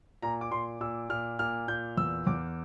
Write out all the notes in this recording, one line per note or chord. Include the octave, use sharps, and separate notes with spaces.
A#2 A#5
D6
A#2 C6
A#2 E6
A#2 F6
A#2 F6
A#2 G6
E2 E6
E2 D6